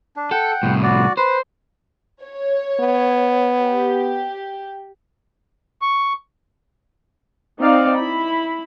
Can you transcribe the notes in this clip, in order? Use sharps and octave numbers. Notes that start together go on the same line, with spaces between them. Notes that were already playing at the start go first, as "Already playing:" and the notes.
D4
A4 F#5 G5
C2 A2
F#4 D5
B4 C5
C#5
B3
G4
C#6
C4 D#4 D5 F5
E4 B5